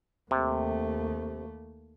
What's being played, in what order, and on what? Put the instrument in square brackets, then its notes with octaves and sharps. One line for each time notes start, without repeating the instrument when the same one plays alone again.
[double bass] D#2 A3 [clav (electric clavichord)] C3